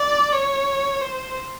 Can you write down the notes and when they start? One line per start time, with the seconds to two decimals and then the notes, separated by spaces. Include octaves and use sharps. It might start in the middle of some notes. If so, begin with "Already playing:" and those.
Already playing: D5
0.33 C#5
1.02 C5